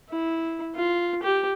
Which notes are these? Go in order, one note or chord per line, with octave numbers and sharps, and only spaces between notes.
E4
F4
G4